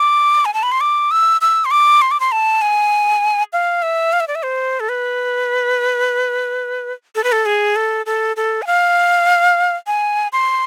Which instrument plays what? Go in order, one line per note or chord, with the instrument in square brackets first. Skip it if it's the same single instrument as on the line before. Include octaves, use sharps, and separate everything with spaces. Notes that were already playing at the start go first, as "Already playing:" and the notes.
Already playing: [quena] D6
G#5
A5
B5
C6
D6
E6
E6
C6
D6
C6
D6
C6
A5
G#5
F5
E5
F5
E5
D5
E5
C5
A4
B4
A4
B4
A4
G#4
A4
A4
A4
G#5
F5
G#5
C6